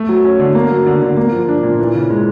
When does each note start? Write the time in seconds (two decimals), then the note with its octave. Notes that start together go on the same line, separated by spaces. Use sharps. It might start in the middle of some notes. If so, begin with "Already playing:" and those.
Already playing: A3
0.09 F#3
0.25 C#4
0.39 D3
0.55 A#3
0.70 F#3
0.87 D3
1.02 D3
1.17 A#3
1.32 F3
1.49 D4
1.63 A#2
1.79 E3
1.94 C#3
2.10 G#3